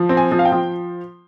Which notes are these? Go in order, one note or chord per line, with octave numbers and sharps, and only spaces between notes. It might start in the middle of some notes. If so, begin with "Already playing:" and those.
Already playing: F3
C4
G#5
F3
F5
G5
F3